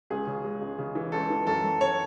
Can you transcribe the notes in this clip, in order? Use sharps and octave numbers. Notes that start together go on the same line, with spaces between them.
C#2 G#4
C#3
G#3
C#2
C#3
E3
C#2 A4
E3
F#2 A4
F#2
C#5